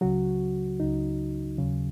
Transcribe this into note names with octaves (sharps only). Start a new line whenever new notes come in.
C#2 C#3 F#3 F#4
C#2 C#3 F#3 D#4
D#2 C#3 F#3